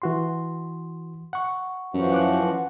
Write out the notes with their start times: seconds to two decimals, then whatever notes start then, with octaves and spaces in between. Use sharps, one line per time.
0.02 E3 F#4 C6
1.33 F#5 C#6
1.94 F#2 E3 F3 F#4
2.12 F#5 D6 F#6